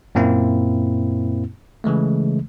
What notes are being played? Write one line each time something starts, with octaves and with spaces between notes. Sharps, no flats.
F#2 A#2 A#3 C4 E4
C#3 E3 G#3 A3